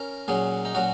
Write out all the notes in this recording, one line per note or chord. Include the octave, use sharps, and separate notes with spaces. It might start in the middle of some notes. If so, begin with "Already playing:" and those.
Already playing: C#4 A#4
A#2 F#3 C#4 G#4
D#4
A#2 F#3 C#4 F#4